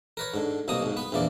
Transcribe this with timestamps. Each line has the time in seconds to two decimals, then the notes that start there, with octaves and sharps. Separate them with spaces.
0.17 A#4 B4 C#5
0.34 G#2 D3
0.68 C2 B2 F#3 A#3 D#6
0.83 B1 G#2
0.97 B3 B4
1.12 A#1 E2 E3 A#3 D5